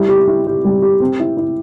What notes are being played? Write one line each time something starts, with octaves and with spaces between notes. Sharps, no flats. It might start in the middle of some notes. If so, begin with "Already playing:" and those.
Already playing: G3 E4
G4
E4
G4
G3
G4
C4
E4
E4